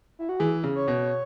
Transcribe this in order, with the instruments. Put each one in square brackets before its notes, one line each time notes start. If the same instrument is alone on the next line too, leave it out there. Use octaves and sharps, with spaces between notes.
[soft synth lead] E4
F#4
[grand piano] E3 [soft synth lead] G#4
[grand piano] C#3
[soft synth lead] C#5
[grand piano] B2